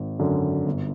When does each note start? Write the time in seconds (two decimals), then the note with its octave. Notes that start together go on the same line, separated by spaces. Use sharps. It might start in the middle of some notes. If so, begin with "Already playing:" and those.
Already playing: G#1
0.19 F#2 D3
0.66 G1